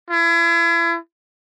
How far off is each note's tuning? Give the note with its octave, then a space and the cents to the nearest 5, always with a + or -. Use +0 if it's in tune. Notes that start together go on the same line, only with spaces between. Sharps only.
E4 +40